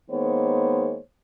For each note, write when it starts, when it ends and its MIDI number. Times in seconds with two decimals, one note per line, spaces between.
0.11 0.98 51
0.11 0.98 56
0.11 0.98 58
0.11 0.98 59
0.11 0.98 72
0.11 0.98 73